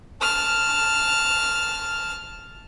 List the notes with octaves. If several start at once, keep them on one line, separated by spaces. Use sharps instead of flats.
A5 F6